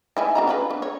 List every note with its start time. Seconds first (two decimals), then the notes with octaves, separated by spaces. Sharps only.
0.17 D#4 E4 G#5
0.35 D4 F#4 A#5
0.47 C#4 F4 B4
0.70 D4
0.82 C#5